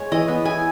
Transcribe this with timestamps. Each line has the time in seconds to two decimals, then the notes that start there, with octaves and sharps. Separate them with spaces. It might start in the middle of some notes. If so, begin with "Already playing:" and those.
Already playing: G#3 C#5
0.12 E3 D#5
0.28 B3
0.45 E4 G#5